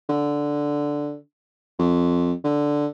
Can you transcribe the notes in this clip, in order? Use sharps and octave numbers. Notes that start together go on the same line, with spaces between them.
D3
F2
D3